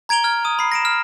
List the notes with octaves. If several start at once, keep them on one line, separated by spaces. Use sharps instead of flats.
A#5 G#6 D7 F7 G7
F6 G#6
D#6 D#7
B5 C7
A#6 D7 E7
F6